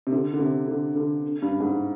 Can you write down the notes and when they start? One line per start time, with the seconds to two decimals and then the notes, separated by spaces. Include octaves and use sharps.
0.07 C3
0.12 D3
0.34 D3
0.40 C3
0.68 D3
0.96 D3
1.42 G2
1.60 G#2